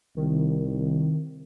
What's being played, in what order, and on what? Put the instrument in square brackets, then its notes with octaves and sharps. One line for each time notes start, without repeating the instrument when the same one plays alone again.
[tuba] C2 [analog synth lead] D#3